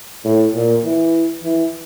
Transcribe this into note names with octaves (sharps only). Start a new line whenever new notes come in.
A2
A#2
E3
E3